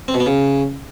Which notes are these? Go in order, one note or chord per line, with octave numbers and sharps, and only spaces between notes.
C4
B2
B3
C#3